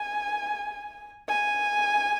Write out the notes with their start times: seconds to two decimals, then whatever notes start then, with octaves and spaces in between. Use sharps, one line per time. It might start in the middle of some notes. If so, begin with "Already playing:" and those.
Already playing: G#5
1.29 G#5